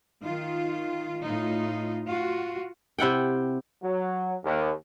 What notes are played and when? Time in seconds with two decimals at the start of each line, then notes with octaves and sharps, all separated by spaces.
0.23 D#3 F4
1.24 A2 D#4 F4
2.07 F4 F#4
2.99 C3 E4 F#5 G5
3.83 F#3
4.44 D#2